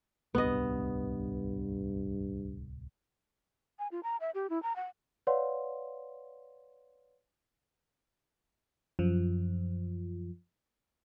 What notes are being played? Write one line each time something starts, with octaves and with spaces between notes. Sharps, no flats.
D1 C2 G2 B3 D#5
G#5
F4
A#5
E5
G4
E4
A#5
F#5
B4 C#5 D5 F5 F#5 C6
F#2 F3